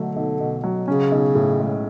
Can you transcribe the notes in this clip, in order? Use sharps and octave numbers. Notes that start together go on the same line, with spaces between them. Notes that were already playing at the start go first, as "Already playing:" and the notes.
Already playing: B2 D3 F#3 A3
B1
B2
F#3
C#3 C#4
B1
A2
G#3